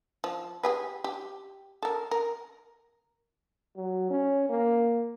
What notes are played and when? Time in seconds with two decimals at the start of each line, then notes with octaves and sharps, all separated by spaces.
0.24 F3
0.63 G4 G#4 B4
1.04 G4
1.83 A4 A#4
2.11 A#4
3.76 F#3
4.10 C#4
4.49 A#3